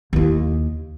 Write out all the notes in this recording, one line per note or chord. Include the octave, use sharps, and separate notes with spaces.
D#2 E4